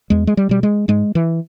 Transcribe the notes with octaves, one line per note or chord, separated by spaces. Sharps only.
E2 G#3
G#3
G3
B2 G3
G#3
G#2 G#3
E3